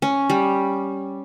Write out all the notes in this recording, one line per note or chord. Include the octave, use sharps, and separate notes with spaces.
C#4
G3